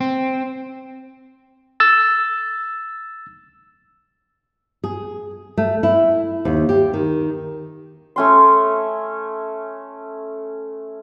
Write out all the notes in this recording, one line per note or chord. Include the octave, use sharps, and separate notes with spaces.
C4
E6 A6
G#4
A3
E4
D#2
G4
D#3
A3 C#4 C6